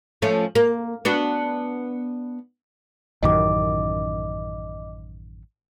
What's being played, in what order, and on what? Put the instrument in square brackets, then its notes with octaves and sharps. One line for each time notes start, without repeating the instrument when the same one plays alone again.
[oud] F3 A3 C#4
A#3
B3 D4 F#4
[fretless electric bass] A1 F#2 D#3 [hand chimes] D#5 D6